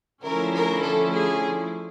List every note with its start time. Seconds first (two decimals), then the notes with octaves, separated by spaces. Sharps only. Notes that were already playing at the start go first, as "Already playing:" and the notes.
0.24 D3 F3 A3 C#4 E4 A#4
0.54 A#4
0.84 A4
1.14 G#4